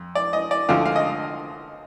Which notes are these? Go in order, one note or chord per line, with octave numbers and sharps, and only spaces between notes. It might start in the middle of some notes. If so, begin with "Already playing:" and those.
Already playing: F2
D5
D#5
D5
D2 D3 F3 F5
F5
D#5